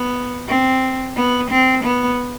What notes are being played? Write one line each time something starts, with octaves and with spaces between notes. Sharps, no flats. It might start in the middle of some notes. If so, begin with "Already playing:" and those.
Already playing: B3
C4
B3
C4
B3